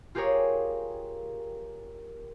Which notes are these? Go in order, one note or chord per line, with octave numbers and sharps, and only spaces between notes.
F4 G4 G#4 A#4 C#5